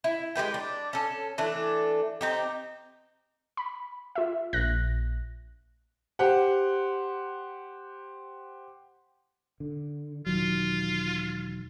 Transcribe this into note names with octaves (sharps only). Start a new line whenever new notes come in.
E4
G#3 G4 B4 G5
D4
C#4 A4
E3 A3 D4
C4 D#4 G4
B5
F4 E5
A#1 F#6 A#6
G4 C5 F#5
D3
E1 D#3 F#3 F4